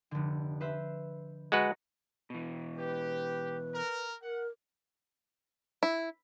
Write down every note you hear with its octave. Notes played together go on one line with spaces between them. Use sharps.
F1 D3
B4 C5 E5
G#3 F#4 B4 A#5 C#6 A#6
B2 E3
G4 B4
A#4
A#4 F#5
E4